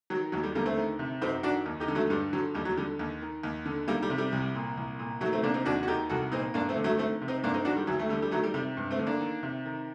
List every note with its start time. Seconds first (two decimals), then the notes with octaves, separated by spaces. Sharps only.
0.10 D#3 F#3
0.32 D#2 F#3
0.43 G3
0.55 D3 G3 A#3
0.66 A3 C4
0.77 D#3
0.99 C3
1.21 F#2 C4 D#4
1.43 D#3 D4 F#4
1.66 D#2
1.80 D#4 G4
1.88 D3
1.95 F#3 A3
2.10 G2 G3
2.33 D3 F#3
2.55 D#2 G3
2.65 F#3
2.77 D3 G3
2.99 D#2
3.21 D#3
3.43 D#2
3.66 D3
3.88 D#3 G3 A#3
4.02 G3
4.10 C3
4.18 G3
4.32 C2
4.55 A#2
4.77 C2
4.99 A#2
5.21 D#3 F#3 A3
5.33 A3 C4
5.43 C3 A#3 D4
5.54 C4 D#4
5.65 D#2 D4 F#4
5.83 F#4
5.88 D#3 D#4 G4
6.09 C2 F#4 A4
6.32 A#2 C4 D#4
6.54 G2 A#3 D4
6.69 A3 C4
6.76 D3
6.84 F#3 A3
6.98 D#3 A3 C4
7.21 C3
7.28 C4 D#4
7.43 G2 A#3 D4
7.54 C4 D#4
7.65 D#3 D4 F#4
7.76 G3
7.87 D2 F#3
7.99 A3
8.09 D3 G3
8.22 G3
8.31 D#3 F#3 A3
8.43 G3
8.54 C3 G3
8.77 G2
8.91 A3 C4
8.99 D3
9.07 A#3 D4
9.20 D#3
9.43 C3
9.65 D#3